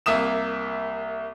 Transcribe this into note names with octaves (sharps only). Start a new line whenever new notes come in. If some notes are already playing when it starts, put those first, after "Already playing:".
C2 A#3 E5 D#6 E7